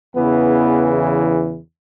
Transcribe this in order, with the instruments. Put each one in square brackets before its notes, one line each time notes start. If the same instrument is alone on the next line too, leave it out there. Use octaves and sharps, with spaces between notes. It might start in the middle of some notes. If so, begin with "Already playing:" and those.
[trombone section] E2 C#3 E3 B3